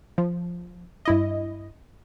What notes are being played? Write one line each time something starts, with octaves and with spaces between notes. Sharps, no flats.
F3
G2 E4 D#5